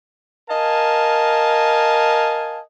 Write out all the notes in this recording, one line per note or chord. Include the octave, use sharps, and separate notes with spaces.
A#4 D#5 F5 G#5 A5